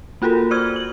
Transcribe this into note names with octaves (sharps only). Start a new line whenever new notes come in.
A#3 F4 F#4 A4 A#4
C5 D5 F6 G#6
F#7